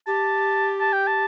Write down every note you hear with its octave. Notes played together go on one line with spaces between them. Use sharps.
G4 A5
A5
G5
A5